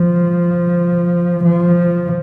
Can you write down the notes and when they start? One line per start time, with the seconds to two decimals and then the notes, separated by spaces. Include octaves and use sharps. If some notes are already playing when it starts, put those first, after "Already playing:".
Already playing: F3
1.44 F3